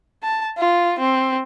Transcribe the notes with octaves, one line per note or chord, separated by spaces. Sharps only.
A5
F4
C4